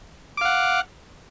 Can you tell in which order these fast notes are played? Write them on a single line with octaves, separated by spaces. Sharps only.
D6 F5 F#5